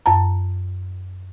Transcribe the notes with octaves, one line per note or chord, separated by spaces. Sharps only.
F#2 A5 A#5